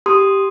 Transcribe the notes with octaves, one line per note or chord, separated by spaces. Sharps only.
G4 C6 D#6